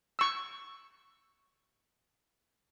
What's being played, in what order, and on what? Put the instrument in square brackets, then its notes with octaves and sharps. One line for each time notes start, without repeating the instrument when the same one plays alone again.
[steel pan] C#6 E6